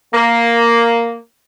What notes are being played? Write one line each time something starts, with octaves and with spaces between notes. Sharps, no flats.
A#3